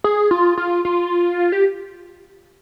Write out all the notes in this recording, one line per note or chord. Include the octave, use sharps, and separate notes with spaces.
G#4
F4
F4
F4
G4